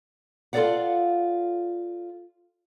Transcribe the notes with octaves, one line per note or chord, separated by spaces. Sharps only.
F4 A4 A#4 D5 F5 F#5